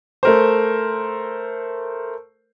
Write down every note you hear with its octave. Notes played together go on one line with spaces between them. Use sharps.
A3 A#4 C5